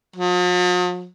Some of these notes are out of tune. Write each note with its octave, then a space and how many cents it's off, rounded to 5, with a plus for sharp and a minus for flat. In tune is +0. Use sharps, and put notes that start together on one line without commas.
F3 +45